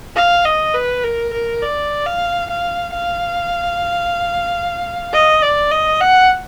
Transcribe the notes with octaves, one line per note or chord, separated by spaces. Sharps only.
F5
D#5
B4
A#4
A#4
D5
F5
F5
F5
D#5
D5
D#5
F#5